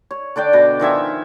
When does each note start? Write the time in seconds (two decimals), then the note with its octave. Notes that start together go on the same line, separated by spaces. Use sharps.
0.11 C#5
0.36 D3 D4 D5 G5
0.53 B2
0.80 D#3 F3 E5 G#5